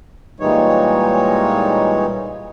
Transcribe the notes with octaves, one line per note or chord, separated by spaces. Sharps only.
A#2 E3 G3 G#3 D#4 C#5